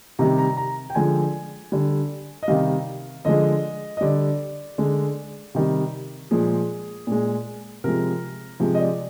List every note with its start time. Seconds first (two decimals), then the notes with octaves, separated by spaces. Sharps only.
0.19 C3 D#3 G3 A#5
0.38 A#5
0.57 A#5
0.90 G5
0.95 D3 F3 G#3 G#5
1.72 D3 G3
2.43 D#5
2.48 C3 D#3 G3 F5
3.25 D3 F3 G#3 D#5
3.97 D#5
4.01 D3 G3 D5
4.78 D3 G#3
5.55 C3 D#3 G3
6.31 A#2 F3 G#3 G#4
7.07 A#2 G#3
7.84 C3 F3 G#3 A#4
8.60 C3 F3 G#3
8.75 D#5
8.80 D5